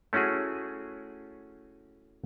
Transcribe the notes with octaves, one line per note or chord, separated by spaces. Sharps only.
A3 C#4 E4 F#4 G#4